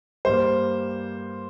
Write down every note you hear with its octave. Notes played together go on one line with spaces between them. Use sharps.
G2 G3 A#3 C5